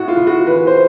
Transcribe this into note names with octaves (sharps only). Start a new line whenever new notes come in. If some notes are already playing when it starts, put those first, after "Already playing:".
Already playing: A2 F#4
F4
A2
F#4
E3 B4
C5